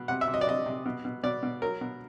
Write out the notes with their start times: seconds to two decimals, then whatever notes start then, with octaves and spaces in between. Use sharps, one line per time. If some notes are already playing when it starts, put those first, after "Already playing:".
Already playing: B2
0.08 C3 F#5
0.21 E5
0.28 C3
0.34 D#5
0.41 D5
0.47 C3 D#5
0.66 C3
0.86 B2
1.05 B2
1.23 B2 D5
1.43 B2
1.62 F#3 A#4
1.81 B2